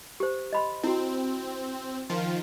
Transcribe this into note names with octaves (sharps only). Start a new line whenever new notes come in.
G4 C5
D#5 B5 C6
C4 E4 F#4
D#3 F3 F4